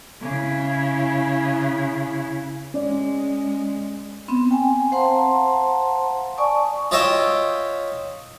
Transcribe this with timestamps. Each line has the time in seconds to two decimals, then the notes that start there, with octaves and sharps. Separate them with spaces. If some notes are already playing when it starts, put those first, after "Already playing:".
0.21 C#3 E4
2.74 G#3 C#4 D5
4.28 B3 C4
4.49 C4 G5 G#5
4.92 C5 F5 F#5 A5 A#5 C6
6.37 D5 G#5 A5 C#6 D#6
6.91 F4 C#5 D#5 E5 G5